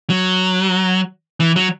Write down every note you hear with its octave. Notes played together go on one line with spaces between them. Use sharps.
F#3
E3
F#3